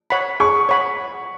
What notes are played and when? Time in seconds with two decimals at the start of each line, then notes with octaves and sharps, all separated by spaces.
0.10 C#5 F#5 B5
0.40 G#4 C#6
0.69 C#5 F#5 B5